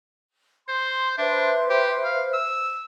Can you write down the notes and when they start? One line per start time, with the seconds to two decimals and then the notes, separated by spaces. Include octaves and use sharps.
0.68 C5 C6
1.18 D4 B4 C5 E5
1.70 G4
2.04 F5
2.33 E6